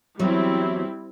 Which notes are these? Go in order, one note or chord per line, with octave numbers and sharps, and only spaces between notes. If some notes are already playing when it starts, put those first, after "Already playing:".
E2 F#3 G3 C4 E4